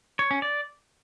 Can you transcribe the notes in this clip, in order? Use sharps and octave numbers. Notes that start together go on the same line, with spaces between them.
C#5
C#4
D5